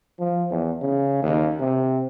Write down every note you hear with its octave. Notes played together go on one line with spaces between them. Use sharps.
F3
E2
C#3
D#2
C3